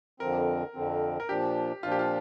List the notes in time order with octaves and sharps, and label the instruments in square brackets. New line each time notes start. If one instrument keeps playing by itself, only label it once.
[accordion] F2 D3 F3 C4 [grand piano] A#4
[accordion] F2 D3 F3 C4
[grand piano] A#4
[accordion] A#2 F3 D4 [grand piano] G4
[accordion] A#2 F3 D4 [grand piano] F4
[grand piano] G4
F4